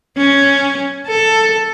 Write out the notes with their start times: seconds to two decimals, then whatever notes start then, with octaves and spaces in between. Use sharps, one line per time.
0.17 C#4
1.07 A4